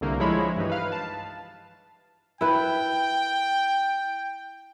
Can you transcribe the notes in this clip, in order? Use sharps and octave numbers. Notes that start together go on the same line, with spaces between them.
C2 D3 A3 A#3
F3 G#3 E4 C#5 B5
G2 E3 D#4
B4 F5
A5
E4 B4 G5